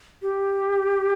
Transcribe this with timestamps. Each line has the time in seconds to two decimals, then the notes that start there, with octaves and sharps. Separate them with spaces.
0.22 G4